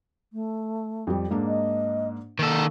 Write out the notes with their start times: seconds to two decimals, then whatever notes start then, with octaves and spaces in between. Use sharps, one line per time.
0.33 A3
1.07 F2 G3
1.30 G#2 A#3 D4
1.47 D#5
2.39 D#3 A#3 A4